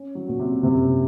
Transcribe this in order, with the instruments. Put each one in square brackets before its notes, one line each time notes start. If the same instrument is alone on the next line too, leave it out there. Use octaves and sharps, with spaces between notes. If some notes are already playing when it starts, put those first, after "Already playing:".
Already playing: [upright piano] C#4
[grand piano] F#3
[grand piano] A#2 [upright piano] F#4
[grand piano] C3
[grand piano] F#2 [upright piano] C3